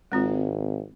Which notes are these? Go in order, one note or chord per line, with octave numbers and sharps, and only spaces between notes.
G#1 G#3 C4 F4